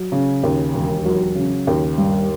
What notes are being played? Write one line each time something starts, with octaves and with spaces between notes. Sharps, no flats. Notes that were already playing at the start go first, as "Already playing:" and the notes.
Already playing: F#3
C#3
D#2
E1
F#3
C#3
D#2
G2